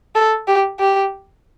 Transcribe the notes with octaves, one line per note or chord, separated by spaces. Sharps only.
A4
G4
G4